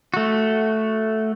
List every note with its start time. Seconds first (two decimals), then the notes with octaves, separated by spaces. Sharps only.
0.14 A3 F#4